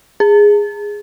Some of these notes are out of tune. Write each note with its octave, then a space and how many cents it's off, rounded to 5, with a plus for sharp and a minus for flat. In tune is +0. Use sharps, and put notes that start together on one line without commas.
G#4 -10